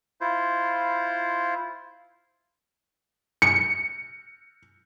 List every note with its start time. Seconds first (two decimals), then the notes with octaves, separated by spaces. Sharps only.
0.21 E4 F4 C5
3.42 C#7